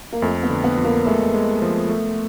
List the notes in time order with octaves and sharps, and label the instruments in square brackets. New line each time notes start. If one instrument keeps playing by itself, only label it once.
[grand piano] A#3
[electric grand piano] F2 [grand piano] A3
[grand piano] B3
[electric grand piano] D3
[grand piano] B3
[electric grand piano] F2
[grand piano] A#3
[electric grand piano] G#3 [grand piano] A3
[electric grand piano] G#3
F3
A3